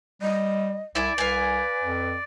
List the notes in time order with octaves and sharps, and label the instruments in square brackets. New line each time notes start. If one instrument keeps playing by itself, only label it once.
[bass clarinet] G3 [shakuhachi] D#5
[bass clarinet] C2 [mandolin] E4 E5 G#5 [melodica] D5
[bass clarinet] C2 [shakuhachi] B4 [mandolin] F5 G#5
[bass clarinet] F2